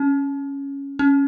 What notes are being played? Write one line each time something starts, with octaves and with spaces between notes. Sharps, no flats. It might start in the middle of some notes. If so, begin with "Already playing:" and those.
Already playing: C#4
C#4